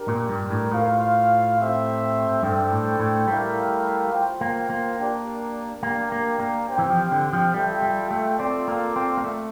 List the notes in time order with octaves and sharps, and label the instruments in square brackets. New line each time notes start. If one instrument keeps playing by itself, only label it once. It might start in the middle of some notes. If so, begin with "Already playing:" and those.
Already playing: [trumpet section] D4 G4 A#4
[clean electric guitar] A#2
G2
A2
[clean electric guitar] A2 [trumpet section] F4 C5 F5
[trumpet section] A3 C4 G4 C5 E5
[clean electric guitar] G2 [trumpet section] D4 A4 C5 G5
[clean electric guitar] A2
A2
[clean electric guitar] G3 [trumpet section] A3 E4 G4 A#4 F5
[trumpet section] F4 C5 G5
[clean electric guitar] A#3
A#3
[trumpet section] D4 G4 A#4 D5
[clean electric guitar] A#3 [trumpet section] D4 G4 A#4 D5 G5
[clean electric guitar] A#3
A#3
[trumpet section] C4 G4 C5 G5
[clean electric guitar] E3
F3
D3
F3
[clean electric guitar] G3 [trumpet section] F4 A4 E5 G5
[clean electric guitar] G3
A3
[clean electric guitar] C4 [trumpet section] F4 A4 D5
[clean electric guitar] A#3
C4
A#3
A3